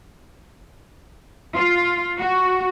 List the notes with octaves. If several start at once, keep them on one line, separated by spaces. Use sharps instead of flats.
F4
F#4